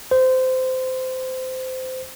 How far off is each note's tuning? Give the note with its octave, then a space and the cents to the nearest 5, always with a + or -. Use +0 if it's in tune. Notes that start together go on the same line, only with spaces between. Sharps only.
C5 -20